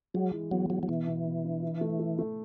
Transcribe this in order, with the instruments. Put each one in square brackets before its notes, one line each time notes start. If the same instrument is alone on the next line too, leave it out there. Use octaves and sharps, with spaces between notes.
[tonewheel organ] F#3 [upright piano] G#3
[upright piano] E3
[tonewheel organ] F#3 [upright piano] B3
[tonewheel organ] F#3 [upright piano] B3
[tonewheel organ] F#3
[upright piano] B2 [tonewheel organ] E3
[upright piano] B2
B2
D4
E4
A3
A3
A3